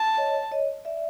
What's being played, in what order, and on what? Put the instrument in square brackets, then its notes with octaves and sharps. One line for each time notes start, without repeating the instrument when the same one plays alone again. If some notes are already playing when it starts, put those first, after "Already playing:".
Already playing: [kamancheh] A5
[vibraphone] C#5 D#5
C#5 D#5
D5 E5